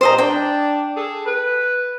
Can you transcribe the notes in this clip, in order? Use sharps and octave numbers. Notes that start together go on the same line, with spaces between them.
A#2 G3 C5 D#5 A#5
D4 G5
G#4 A4
B4